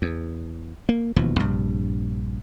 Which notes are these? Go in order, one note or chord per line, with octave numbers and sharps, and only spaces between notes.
E2
A#3
E1 D#2 B2 F3
A#1 G2 C3